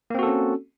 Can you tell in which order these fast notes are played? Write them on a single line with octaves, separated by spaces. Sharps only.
A#3 C4 F#4 A4 C#4